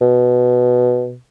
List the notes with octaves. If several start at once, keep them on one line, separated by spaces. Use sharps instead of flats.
B2